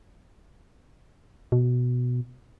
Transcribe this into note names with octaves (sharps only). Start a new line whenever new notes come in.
B2